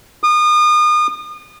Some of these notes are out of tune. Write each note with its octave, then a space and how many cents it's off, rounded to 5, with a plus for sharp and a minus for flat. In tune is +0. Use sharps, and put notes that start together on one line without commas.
D#6 -35